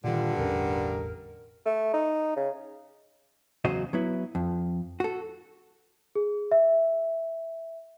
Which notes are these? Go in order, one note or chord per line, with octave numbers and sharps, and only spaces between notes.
G2 A#2 D3 D#3 F4
E1 A1 C#4 A#4
A3
D#4
C#3
E2 C#3 F#3 F#4 C5 D#5
F#3 B3 E4
F2
F#4 A4
G#4
E5